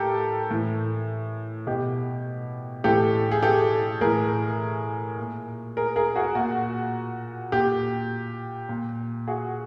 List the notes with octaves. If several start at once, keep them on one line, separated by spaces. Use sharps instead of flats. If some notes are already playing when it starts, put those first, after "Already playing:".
Already playing: A2 G4 A4 A#4
A2 E3
B2 G4
A2 E3 G4 A4
G#4
G4 A4
A2 E3 G#4 A#4
A#2
G#4 A#4
G#4 A#4
F#4 G#4
A#2 F#4
A#2 G4
A#2
F#4 G#4